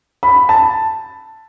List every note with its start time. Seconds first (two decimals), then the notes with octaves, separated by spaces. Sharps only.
0.23 B5
0.49 A5